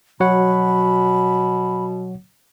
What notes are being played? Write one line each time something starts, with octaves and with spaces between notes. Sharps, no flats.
B2 F#3 C#5 F#5 B5